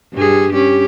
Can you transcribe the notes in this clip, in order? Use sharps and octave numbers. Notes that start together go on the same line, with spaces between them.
G2 G3 G#4
C#4 G4